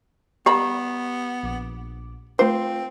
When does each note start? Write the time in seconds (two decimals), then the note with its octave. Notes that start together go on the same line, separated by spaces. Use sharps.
0.46 G3 B3 G4 A#5 B5 D6 E7
1.43 A#1 D6
2.39 A3 C4 F4 C5 F5